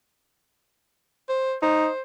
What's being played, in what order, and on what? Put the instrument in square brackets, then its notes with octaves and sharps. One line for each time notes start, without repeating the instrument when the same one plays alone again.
[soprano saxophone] C5
[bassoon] D#4 [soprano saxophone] C5